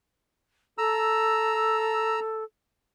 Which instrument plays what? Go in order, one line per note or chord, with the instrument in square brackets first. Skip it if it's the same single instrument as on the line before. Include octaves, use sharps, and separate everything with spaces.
[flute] A4 [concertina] A#5 E6